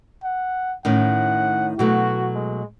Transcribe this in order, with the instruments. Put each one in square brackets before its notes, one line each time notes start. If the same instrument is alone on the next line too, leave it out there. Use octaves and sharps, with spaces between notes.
[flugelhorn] F#5
[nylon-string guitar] A2 D#3 C#4 [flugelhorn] F#5
[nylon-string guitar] B2 F#3 A3 [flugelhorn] F#4
[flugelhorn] G#3